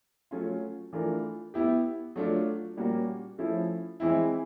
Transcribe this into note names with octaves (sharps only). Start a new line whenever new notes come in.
F#3 A3 C#4 F4
E3 A3 D4 F4 A#4
B3 E4 G4
F#3 A3 D4 F4
A#2 G3 A#3 C#4 F#4
F3 A3 C#4 E4
E3 G#3 C4 E4